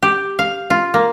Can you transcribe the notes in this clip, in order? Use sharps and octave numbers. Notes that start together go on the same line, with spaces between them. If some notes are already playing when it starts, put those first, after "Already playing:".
G4
F5
F4
A#3